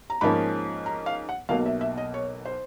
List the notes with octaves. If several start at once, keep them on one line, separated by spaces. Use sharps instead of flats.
A#5
G#2 F3 A#3 C#4 B5
A#5
F5
F#5
B1 B2 F#3 A#3 F5
E5
E5
D#5
C#5
C5